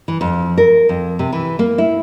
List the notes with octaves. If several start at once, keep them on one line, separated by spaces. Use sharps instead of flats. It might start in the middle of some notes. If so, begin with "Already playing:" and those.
E3
F2
A#4
F2
C3
E3
A#3
E4